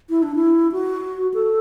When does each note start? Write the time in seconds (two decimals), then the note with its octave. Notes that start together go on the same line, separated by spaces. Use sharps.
0.10 E4
0.23 D4
0.35 E4
0.72 F#4
1.34 A4